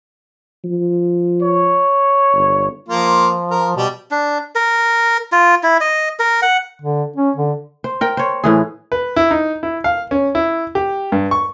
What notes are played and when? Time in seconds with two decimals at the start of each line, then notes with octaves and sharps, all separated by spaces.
0.64 F3
1.42 C#5
2.33 G1
2.89 F3 A#3 F4
3.51 A#4
3.77 B2 G3
4.11 D4
4.55 A#4
5.32 F4
5.63 E4
5.81 D#5
6.19 A#4
6.42 F#5
6.82 D3
7.16 C#4
7.36 D3
7.84 C5
8.01 A#4 G5
8.17 C5 C#5
8.44 A2 E3 G#4
8.92 B4
9.16 E4
9.31 D#4
9.63 E4
9.84 F5
10.11 C#4
10.35 E4
10.75 G4
11.12 G2
11.31 C#6